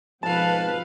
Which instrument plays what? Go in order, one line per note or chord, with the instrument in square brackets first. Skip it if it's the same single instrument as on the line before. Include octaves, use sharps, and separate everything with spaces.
[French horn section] G#2 B2 F3 [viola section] C4 B4 [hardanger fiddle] A4 F5 [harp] A5